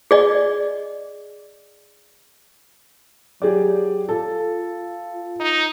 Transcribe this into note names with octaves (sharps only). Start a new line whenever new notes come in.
G#4 D5 D#5
F#3 G4 G#4 D5
F4 A4
D#4